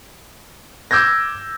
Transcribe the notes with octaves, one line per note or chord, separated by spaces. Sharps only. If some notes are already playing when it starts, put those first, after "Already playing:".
D6 E6 G6 G#6 A#6